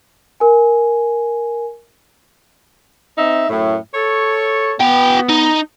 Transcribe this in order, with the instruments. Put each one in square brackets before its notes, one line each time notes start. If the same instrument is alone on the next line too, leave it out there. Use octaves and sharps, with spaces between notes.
[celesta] A#4 G#5
[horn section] C4 D#4 E5
F#2 A2
A4 C#5
[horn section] B3 [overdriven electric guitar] F#4 G5
[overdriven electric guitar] D#4